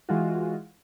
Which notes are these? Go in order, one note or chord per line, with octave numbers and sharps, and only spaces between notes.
E3 G#3 F4 F#4